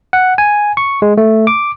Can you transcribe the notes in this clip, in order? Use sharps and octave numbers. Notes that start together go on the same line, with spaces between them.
F#5
G#5
C#6
G#3
A3
D6